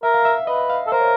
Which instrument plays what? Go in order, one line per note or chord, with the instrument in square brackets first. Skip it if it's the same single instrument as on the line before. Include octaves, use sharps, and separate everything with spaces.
[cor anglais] A#4 [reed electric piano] E5
[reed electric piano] F5
E5
[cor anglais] B4 [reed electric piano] D#5
[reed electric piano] F5
[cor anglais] A4
[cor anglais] A#4 [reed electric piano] C5
[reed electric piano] C#5